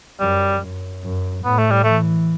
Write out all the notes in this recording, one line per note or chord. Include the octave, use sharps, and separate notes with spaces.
F#2 G3
F#2
F#2
A2 B3
A3
G3
E3 A3